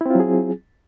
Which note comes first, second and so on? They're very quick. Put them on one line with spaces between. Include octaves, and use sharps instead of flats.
E4 C4 F4 F#3 G#4